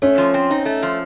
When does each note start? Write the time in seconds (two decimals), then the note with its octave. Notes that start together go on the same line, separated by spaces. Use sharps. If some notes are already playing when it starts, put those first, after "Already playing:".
0.02 A3 C#4
0.18 F3
0.34 C4
0.51 D#4
0.65 A3
0.83 F3